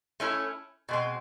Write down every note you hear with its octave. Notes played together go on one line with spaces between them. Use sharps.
A3 C#4 E4 A4
B2 G#3 C4